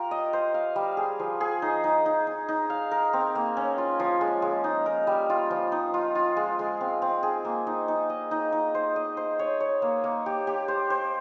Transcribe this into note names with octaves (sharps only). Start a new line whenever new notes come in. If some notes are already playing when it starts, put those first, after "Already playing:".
Already playing: F4 G4 A#4
D#5
C5
F5
G3
G#4
F3
G#4
D#4
D#4
D#4
D#4
D#4
F5
A#4
C4
A#3
C#4
F4
F3
G#3
G#3
D#4
A#4
G3
F4
F3
D#4
F4
F4
G#3
G#3
C4
C4
G#4
A#3
D#4
D#4
D#5
D#4
D#4
C5
D#5
C5
C#5
C#5
A#3
A#3
G4
G4
C5
C5